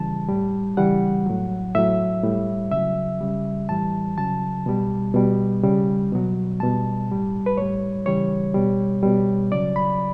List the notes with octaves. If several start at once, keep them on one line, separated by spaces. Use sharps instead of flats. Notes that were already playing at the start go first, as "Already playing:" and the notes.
Already playing: C#3 E3 G3 A5
A2 G3
C#3 E3 G3 F#5
A2 F#3
A2 F#3 E5
A2 G3
C#3 F#3 E5
C#3 G3
A2 E3 G3 A5
C#3 F#3 A5
B2 G3
B2 G3
C#3 G3
B2 F#3
B2 G3 A5
A2 G3
B4
A2 G3 C#5
C#3 E3 G3 C#5
B2 G3
B2 G3
C#3 F#3 D5
B5